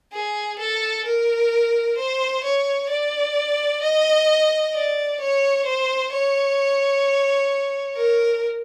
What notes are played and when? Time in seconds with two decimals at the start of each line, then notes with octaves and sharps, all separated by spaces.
0.13 G#4
0.59 A4
1.06 A#4
1.98 C5
2.44 C#5
2.90 D5
3.82 D#5
4.74 D5
5.20 C#5
5.65 C5
6.13 C#5
7.97 A#4